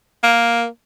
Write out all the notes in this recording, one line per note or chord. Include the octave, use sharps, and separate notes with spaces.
A#3